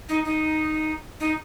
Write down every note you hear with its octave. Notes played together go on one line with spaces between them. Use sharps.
D#4
D#4
D#4